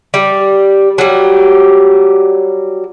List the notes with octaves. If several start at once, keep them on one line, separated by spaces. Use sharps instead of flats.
G3
F#3 G3